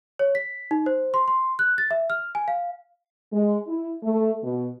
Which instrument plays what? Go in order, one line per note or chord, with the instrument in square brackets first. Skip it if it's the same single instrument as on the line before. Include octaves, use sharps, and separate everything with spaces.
[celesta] C#5
B6
D#4
C5
C6
C6
F#6
A6
E5
F6
G#5
F5
[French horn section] G#3
E4
A3
B2